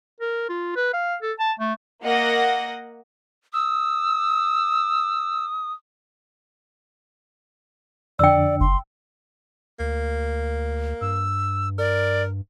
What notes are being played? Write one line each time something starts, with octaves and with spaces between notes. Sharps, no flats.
A#4
F4
B4
F5
A4
A5
A3
A#3 D#5 F#5 A#6
D#6 E6
F2 D3 D4 D5 G5 E6
F#1 C6
D2 A#3
G2 E6
A#4 D5